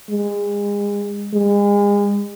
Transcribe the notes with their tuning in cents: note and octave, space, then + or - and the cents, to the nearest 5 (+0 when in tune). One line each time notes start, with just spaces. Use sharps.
G#3 -30
G#3 -35